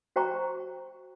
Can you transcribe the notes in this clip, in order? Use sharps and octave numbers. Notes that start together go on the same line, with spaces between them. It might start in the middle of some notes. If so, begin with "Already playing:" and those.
F#4 C5 G5 A#5 C#6